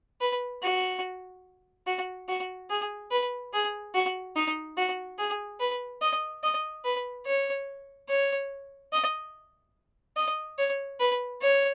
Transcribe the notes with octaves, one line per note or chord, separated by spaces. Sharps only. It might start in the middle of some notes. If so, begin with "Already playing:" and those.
B4
F#4
F#4
F#4
G#4
B4
G#4
F#4
D#4
F#4
G#4
B4
D#5
D#5
B4
C#5
C#5
D#5
D#5
C#5
B4
C#5